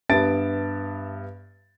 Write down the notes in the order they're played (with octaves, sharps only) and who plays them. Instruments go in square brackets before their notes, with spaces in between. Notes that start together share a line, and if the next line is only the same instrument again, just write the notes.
[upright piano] G2 B3 E5 A5 A6 D7